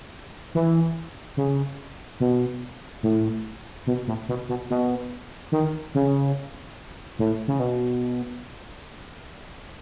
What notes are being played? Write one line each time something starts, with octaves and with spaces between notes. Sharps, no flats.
E3
C#3
B2
A2
B2
A2
B2
B2
B2
D#3
C#3
A2
C#3
B2